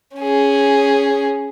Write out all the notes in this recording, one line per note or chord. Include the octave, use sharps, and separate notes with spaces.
C#4 G#4